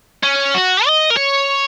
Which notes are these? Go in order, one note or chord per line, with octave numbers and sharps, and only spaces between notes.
C#4
F#4
D#5
A#4
C#5